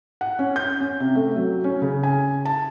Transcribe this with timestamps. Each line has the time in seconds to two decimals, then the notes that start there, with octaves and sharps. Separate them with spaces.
0.21 F#5
0.39 C#4
0.56 G6
0.81 C#4
1.00 C3
1.15 A3
1.36 F#3
1.64 C#4
1.82 C#3
2.03 G#5
2.45 A5